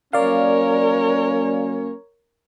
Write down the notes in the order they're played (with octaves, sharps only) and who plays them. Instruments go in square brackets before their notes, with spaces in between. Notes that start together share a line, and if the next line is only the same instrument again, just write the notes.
[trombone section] F#3 A#3 C#4 [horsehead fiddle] A#4 C#5 [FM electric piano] D5 F5